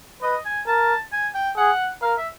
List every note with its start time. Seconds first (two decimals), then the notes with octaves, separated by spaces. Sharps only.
0.22 B4 D#5
0.45 G#5
0.67 A#4 A5
1.12 G#5
1.34 G5
1.57 G#4 F#5
2.02 A#4 F5
2.18 E5